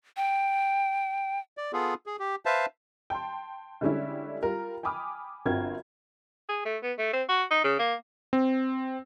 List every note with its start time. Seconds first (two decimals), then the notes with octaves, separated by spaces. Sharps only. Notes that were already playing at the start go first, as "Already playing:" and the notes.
0.17 G5
1.57 D5
1.73 B3 F4 G#4 A4
2.06 G#4
2.19 G4
2.46 B4 C5 E5 F5 A5
3.10 G5 A5 C6
3.81 D3 G3 G#3 C#4 D4 E4
4.43 G3 F4 A#4
4.83 G5 G#5 B5 D6 D#6 F6
5.46 G1 C4 F4 F#4 A#4 G#6
6.49 G#4
6.65 A3
6.83 B3
6.99 A3
7.13 C4
7.29 F#4
7.51 D#4
7.64 C#3
7.79 A#3
8.33 C4